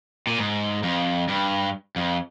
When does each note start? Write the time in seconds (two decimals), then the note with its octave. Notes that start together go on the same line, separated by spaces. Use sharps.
0.27 A#2
0.39 G#2
0.83 F2
1.28 G2
1.96 F2